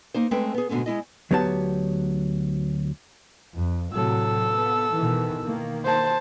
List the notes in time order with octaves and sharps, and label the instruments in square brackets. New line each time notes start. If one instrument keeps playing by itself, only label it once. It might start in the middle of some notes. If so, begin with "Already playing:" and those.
[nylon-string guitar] A#3 D#4 C5
G#3 A3 C4 C#4 B4 G5
B3 G#4
G#2 B2 D3 A3 C#4
G#3 E4 D#5
[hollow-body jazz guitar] D2 F#3 B3 G4 C#5 A5
[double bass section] F2
[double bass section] A2 C3 F#3 [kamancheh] A4 E6
[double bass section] B3
B2 D#3 E3
D#3 A#3
[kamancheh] C5 A5